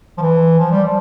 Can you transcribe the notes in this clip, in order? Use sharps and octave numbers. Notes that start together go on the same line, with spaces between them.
F3
E3
F3
G3
F3